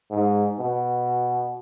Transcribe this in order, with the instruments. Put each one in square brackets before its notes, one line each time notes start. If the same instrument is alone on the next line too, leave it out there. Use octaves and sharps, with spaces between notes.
[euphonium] G#2
B2